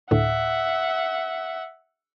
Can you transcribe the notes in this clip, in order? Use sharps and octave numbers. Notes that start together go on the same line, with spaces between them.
D2 A2 E5 F#5